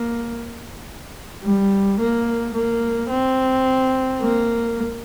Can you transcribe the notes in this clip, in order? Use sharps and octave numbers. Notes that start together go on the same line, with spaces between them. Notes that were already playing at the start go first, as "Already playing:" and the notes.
Already playing: A#3
G3
A#3
A#3
C4
A#3